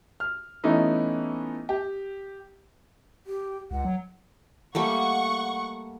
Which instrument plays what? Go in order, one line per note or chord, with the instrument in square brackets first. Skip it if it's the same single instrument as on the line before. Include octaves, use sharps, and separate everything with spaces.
[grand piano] F6
E3 A3 B3 C#4 D#4 E4
G4
[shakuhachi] G4
[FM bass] C#2 [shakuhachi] F#5
[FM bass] F#3
[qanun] G3 A3 A#3 [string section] F#5 C#6